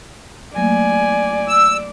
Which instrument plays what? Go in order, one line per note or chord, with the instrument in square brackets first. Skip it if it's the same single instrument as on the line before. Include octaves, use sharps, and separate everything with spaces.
[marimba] F#3 A3 A#3 [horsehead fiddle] D5 [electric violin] G#5
[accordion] E6